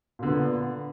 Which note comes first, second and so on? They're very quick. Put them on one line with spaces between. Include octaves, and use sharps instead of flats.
A#2 D3 B3